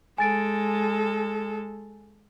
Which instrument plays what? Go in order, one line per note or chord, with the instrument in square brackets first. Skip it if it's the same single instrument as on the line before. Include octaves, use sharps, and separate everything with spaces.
[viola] G#3 A4 [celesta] G#5 A6 D7